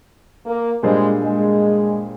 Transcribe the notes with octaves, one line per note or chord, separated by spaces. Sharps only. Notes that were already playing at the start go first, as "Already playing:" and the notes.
A#3
A#2 G3 G#3 D4 G#4 C5
G#3